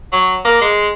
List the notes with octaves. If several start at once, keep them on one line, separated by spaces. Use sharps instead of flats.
F#3
A#3
G#3